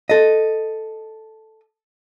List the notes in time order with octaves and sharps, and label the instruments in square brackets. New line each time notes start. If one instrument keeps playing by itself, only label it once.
[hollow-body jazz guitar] A4 D#5